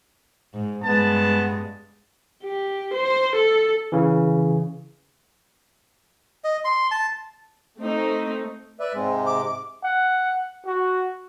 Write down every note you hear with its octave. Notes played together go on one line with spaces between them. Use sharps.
G#2
G2 G#3 B3 A5
G4
C5
A4
C#3 E3
D#5
C6
A5
A3 C4 D#4
B4 D5 E5
G#2 C3 G#3
D6
F#5
F#4